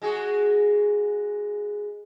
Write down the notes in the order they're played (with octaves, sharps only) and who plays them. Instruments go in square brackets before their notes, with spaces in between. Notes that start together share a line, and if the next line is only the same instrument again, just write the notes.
[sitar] G#3 F#4 G#4